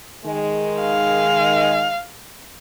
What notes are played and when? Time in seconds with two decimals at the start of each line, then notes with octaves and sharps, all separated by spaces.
0.25 D#3 G#3
0.81 F5